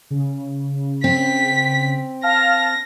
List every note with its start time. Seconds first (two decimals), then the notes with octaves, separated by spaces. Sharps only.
0.10 C#3
1.04 C4 B6
2.23 F5 A5 F6 A#6